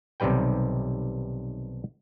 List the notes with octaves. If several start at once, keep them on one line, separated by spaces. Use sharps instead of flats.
B1 C3 D#3 G3 B4 G5